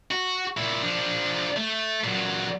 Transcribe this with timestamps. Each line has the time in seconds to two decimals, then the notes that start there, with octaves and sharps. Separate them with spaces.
0.11 F#4
0.57 A#2 E4
0.82 F3 D4
1.56 A3
2.04 A#2 F#3